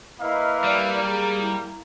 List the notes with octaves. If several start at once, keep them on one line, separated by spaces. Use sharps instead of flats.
A#3 E4 B4 D#5 F5
G3 D5
G#4 A#5
E4